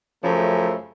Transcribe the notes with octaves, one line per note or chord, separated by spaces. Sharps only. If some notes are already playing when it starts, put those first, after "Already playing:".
F#2 C#3 F3 A3 A4